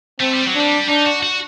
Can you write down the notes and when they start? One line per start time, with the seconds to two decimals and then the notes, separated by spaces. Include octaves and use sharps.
0.20 A3 C4
0.33 G3
0.46 F#3
0.55 G3 D4
0.88 D4 D#4
1.06 F#4
1.23 F#4